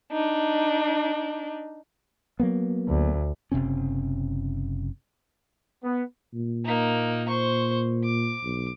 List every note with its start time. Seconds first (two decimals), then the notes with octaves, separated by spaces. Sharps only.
0.10 D4 D#4
2.40 F#3 A#3 B3
2.88 D2
3.52 F#1 C3 C4 C#4
5.84 B3
6.34 A#2
6.65 A#3 D#4
7.28 C5 C#6
8.04 D6
8.44 B1